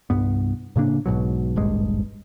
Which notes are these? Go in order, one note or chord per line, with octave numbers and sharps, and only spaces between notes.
C2 G2 B3
A2 C#3 A#3 D4
B1 G#2 B2 F#3
D#1 G#1 G2 G#3